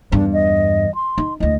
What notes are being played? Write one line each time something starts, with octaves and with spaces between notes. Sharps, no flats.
E2 G2 D4
D#5
C6
D#4
D2 E4 D#5